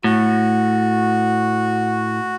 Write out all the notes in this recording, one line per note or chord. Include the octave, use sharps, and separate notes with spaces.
A2 F#4